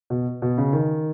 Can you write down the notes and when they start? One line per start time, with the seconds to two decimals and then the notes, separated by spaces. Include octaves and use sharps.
0.10 B2
0.42 B2
0.58 C#3
0.73 D#3